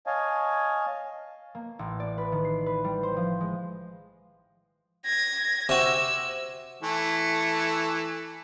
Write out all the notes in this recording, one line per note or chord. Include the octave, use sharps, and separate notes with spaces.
C#5 D#5 F5 G#5 A5
A#3
A1
D5
B4
D#3
C7
B4
G3
C5
F3
G#3
G#6 A#6
C3 F#4 E6
E3 A3